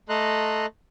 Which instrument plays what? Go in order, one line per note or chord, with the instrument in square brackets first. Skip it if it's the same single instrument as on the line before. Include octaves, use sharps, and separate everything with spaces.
[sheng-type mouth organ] A3 A4 D#5 A#5 C6 F#6